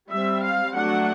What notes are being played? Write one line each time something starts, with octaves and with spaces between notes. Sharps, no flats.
G3 C4 E5
F5
F#3 A3 D4 F#5